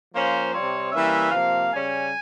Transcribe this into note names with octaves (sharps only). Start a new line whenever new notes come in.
F3 A#3 C#4 C5
C3 G3 C4 C#5
E3 G3 A#3 C#4 E5
C3 F3 A#3 F5
C#3 G3 C#4 G#5